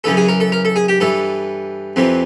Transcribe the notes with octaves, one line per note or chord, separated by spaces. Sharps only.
F#2 C#3 E3 A4
G#4
A#4
A4
A#4
A4
G#4
G4
G2 E3 A4
F2 C3 E3